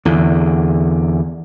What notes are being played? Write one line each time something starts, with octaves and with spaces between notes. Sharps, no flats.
E2 D3